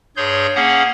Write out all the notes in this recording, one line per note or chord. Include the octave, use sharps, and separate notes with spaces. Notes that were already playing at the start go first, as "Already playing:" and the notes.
G2 G#4 C#5 C6 G6
A#3 C#4 G#4 F#5